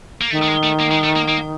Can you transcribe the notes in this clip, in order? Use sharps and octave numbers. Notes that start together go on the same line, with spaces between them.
A#3
D#3 A3
A3
G#3
A3
A#3
G#3
A3
A#3
A#3